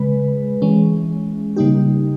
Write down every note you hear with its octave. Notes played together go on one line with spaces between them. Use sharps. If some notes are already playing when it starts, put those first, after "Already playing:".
Already playing: C#3 G#3 B4
E3 G#3 C#4
C#3 G3 A#3 D#4 G4